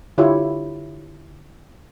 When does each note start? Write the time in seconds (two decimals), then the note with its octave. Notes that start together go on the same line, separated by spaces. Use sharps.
0.18 D3 E4 F4 G4 C#5